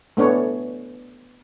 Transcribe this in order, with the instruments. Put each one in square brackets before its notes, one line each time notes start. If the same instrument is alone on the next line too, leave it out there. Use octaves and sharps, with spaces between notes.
[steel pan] A3 B3 D4 C#5